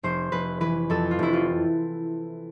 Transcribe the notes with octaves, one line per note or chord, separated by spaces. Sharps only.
F1 C5
F1 B4
E3 B4
F2 A4
F4
F1 E4
F4